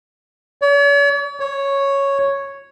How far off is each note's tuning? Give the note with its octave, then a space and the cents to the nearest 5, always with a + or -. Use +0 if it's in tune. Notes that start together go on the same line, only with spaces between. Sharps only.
C#5 +45
C#5 -5